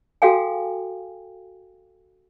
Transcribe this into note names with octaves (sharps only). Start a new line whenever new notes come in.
F#4 G#4 A4 F5 G5 G#5